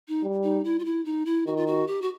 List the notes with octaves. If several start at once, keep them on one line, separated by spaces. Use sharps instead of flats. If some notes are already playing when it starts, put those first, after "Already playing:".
D#4
G3
D#4
E4
F4
E4
D#4
E4
D#3 F#4
F4
F#4
G4
F#4